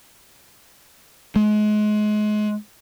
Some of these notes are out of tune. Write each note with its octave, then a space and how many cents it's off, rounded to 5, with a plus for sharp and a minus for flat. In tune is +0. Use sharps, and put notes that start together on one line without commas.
G#3 +30